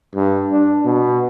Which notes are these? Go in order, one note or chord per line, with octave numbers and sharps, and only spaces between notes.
G2
D4
B2